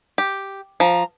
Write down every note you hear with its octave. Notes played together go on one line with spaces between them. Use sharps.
G4
F3 A#5